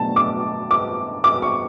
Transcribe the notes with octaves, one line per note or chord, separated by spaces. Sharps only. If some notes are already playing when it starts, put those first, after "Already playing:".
Already playing: B2 F#3 A3 D4 A5
D6
D6
D6
C#6